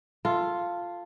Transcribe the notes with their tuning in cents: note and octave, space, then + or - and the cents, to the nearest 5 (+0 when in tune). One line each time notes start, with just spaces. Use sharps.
F4 +0 A4 +10